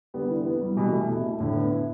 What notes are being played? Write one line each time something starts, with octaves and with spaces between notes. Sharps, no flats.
D3 G3 B3
E3
B3
G3
B2 E3 G4
A3
B2 E4
A3
A2 D3 E4
B3
E4